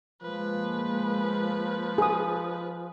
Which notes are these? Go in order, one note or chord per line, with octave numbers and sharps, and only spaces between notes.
F3 G#3 A#3 B4
G#4 D#6